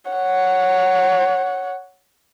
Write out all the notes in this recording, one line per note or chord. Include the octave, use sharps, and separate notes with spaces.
C#5 F#5